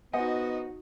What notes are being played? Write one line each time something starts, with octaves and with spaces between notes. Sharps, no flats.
B3 D#4 F#4 C5 D#5 F#5 G#5